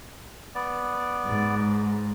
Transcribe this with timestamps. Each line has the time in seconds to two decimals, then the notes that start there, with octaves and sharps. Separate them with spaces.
0.55 B3 D5
1.25 G#2